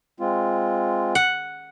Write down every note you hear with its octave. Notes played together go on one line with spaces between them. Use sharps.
G#3 C4 F4
F#5